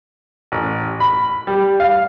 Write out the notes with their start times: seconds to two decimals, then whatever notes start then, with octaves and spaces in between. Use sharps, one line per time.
0.52 A1
1.00 B5
1.47 G3
1.80 F5